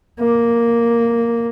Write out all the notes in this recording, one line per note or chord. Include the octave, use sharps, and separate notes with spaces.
A#3